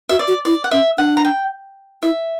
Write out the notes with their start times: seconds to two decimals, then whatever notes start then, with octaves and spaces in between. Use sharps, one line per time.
0.09 F#4 E5
0.19 D5
0.28 F#4
0.45 E4 D5
0.64 F#5
0.71 C#4 E5
0.98 D4 F#5
1.17 A#5
1.25 G5
2.03 E4 E5